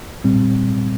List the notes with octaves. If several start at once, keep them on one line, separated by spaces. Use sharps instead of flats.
A#2 G3 C4